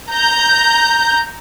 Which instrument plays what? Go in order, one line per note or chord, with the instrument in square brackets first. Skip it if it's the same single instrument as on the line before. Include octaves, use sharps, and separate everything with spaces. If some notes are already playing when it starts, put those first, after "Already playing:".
[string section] A#5 G6